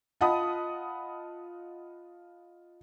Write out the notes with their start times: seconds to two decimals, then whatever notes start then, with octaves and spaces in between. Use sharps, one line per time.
0.21 F4 D#5 F#5 A5 B5 D#6